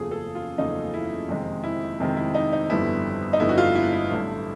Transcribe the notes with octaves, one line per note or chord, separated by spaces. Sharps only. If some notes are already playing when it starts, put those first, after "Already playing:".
Already playing: F#1 E2 C#3 F3 A3 G#4
A4
F4
F#1 E2 C#3 F3 A3 D#4
E4
F2 C3 D#3 G#3
E4
F2 C3 D#3 G#3
E4
D#4
D#4
G1 F2 D3 G3 B3 E4
D#4
G1 F2 D3 G3 B3 E4
F#4
F4
E4
E4
A1 G2 D3 F#3